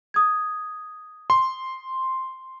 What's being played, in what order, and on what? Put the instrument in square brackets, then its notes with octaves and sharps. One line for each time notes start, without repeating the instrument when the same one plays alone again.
[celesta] D#6 G#6
[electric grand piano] C6